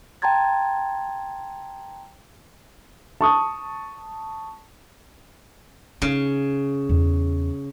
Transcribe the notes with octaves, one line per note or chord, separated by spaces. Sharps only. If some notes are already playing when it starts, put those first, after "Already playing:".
G5 A5 A#5 C6 G#6 A6
A5 C#6 D#6
C#3 D#4
E2